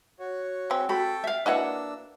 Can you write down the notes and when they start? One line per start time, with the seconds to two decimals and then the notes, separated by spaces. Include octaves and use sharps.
0.20 F#4 C#5
0.70 G#3 C4
0.89 F#4 A4 G5 B5
1.24 E5 F5
1.46 A#3 D4 E4 F#4 B4 D#5 F#5 E6